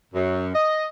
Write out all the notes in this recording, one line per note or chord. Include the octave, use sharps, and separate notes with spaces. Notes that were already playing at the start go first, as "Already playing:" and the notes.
F#2
D#5